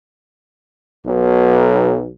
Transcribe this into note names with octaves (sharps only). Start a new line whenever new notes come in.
B1